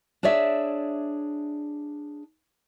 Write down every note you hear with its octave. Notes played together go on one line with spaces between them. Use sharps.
D4 G#4 C#5 D5 E5